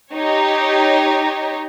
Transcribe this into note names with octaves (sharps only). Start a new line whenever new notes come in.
D#4 G4 C#5